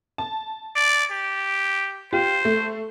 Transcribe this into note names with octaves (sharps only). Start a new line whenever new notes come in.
A5
D5
G4
F4 G4 C5
A3